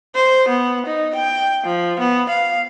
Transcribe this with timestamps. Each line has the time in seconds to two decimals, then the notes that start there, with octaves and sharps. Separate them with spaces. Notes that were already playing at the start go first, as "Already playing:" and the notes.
0.15 C5
0.49 B3
0.86 D#4
1.15 G5
1.64 F3
2.00 B3
2.30 F5